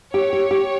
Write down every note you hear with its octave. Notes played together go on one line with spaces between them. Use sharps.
G4 C#5
G4
G4